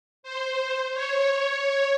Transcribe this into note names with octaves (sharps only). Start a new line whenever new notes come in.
C5
C#5